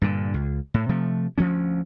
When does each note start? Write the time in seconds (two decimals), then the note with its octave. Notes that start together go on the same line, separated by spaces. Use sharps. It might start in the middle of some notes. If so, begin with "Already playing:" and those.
0.02 G2 A#2 D3
0.34 C#2
0.74 A2
0.89 C3 F3 A3
1.38 D2 F3 F#3 C#4